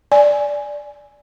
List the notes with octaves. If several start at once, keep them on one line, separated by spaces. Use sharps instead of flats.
D5 G#5